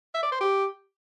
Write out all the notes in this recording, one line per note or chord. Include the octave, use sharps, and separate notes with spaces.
E5
D5
C5
G4